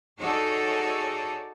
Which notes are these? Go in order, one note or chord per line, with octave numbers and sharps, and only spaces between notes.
D#4 F#4 G#4 A4 C#5 D5